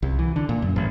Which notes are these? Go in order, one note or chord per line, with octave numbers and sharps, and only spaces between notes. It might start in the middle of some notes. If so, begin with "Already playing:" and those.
C2
E3
D3
A#2
F#2
A1